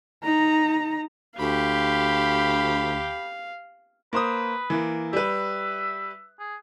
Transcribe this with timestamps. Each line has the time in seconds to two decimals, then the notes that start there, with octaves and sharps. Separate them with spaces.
0.24 D#4 A#5
1.40 D2 G4 F5 B5
4.13 A#3 B4 C5 D#6
4.70 E3 A#3
5.13 G3 B4 E5
6.40 G#4